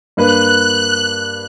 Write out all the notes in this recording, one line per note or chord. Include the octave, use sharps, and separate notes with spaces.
G2 A#3 B4 F#6